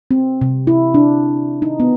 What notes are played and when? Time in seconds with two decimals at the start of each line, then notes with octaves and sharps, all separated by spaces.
0.11 C4
0.41 C3
0.67 E4
0.94 D4
1.62 D#4
1.80 B3